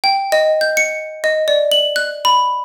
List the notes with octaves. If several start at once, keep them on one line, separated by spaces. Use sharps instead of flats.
G5
D#5
G6
C#7
D#5
D5
F#7
F#6
B5